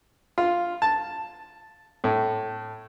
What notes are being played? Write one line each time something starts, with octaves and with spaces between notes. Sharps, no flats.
F4
A5
A2